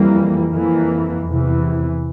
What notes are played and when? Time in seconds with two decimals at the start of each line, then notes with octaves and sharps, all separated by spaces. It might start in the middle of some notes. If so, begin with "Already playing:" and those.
Already playing: F2 E3 G3 A#3
0.51 F2 E3 A#3
1.26 E2 C3 E3